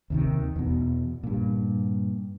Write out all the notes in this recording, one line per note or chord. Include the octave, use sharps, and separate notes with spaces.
D#2 C3 D#3
E2 B2
G2 A#2